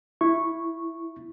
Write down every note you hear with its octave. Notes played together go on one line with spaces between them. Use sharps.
E4 C#6